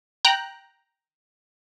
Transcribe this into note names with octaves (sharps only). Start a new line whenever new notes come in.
G5 A#5 F#6